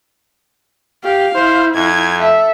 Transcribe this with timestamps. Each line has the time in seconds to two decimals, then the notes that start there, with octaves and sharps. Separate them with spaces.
1.04 G4 F5
1.35 E4 C5
1.75 F2 G#6
2.20 A4 E5